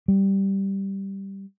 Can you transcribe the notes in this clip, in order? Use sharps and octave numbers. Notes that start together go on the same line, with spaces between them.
G3